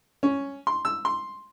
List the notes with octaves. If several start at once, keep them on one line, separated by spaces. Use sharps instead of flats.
C#4
C6
E6
C6